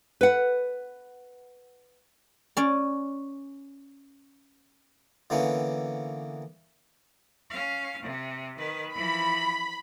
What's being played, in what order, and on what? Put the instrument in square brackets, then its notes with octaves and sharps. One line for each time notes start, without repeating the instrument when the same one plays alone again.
[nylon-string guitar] B4 F#5
[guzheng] C#4 D5
[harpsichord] D3 E3 A#3 B3 C#4
[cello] C#4 F5
C3
D#3 B4
[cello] E3 F3 [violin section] B5